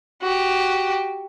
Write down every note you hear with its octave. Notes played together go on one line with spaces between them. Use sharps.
F#4 G4